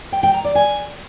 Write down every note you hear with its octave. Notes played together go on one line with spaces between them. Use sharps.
G5
G5
A#5
D5
G#5